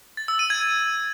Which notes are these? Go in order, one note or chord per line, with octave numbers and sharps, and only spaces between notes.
A6
E6
D#7
G#6